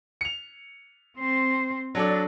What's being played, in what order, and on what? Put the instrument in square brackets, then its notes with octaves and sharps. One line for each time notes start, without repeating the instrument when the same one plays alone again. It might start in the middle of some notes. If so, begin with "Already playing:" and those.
[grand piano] C#7 F7
[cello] C4 C5
[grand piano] F#3 A4 D5 [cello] D4